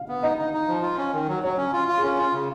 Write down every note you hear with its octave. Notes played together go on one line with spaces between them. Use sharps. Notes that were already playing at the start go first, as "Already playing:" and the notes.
Already playing: F5
B3
D#4 D#5
D#4
D#4
F3
F4
C#4
D#3
F#3
F#3 C#5
C#4
F4
F4
G#4
C#4 A#4
F4
C#3